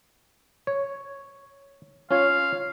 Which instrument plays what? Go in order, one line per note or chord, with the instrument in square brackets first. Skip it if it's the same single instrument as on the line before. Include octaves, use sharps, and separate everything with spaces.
[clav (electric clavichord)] C#5
[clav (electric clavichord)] C#4 F4 C#5 [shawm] F5